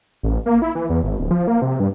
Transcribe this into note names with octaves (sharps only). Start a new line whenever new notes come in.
A1
A#3
E4
E3
E2
G#1
D1
F3
A#3
C3
G2